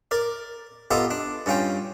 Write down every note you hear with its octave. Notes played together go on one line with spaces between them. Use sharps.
A#4 D5
B3 F4 G4 A4 D#5 A#5
D4
G2 C#4 F4 G5